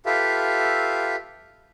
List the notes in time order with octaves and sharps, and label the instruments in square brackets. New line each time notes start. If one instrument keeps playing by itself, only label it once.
[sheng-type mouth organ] F4 G4 A4 B4 E5 F5